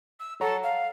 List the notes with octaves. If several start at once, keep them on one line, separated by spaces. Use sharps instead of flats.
E6
A4 C#5 F#5 A#5
F5